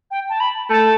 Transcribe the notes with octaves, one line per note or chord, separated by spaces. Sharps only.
G5
A5
B5
A3 A5